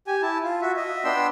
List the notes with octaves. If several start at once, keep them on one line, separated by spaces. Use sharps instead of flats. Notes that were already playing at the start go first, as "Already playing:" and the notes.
G4 G#5
E4 A5
F4
F#4 E5
D#5 E5
B3 D4 G5 C6 E6